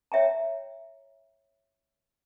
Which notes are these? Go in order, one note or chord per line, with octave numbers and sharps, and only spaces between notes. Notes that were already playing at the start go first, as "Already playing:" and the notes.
C#5 E5 G5 A#5